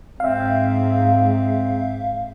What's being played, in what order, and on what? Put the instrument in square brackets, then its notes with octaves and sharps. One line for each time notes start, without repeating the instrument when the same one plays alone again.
[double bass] G#2 [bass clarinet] C4 [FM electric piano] E5 F5